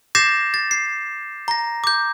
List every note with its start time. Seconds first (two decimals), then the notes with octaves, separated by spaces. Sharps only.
0.15 D6 G6 A6 A#6 C7 E7
0.54 A6
0.71 C7
1.48 A#5 A#6
1.84 D6 G6